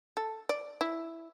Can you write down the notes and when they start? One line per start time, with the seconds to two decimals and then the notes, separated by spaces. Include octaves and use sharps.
0.17 A4
0.49 D5
0.81 E4